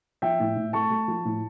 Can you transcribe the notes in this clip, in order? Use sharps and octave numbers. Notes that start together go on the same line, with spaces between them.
F3 E5 G5
A2
A2
A3 A5 C#6
A3
F3
A2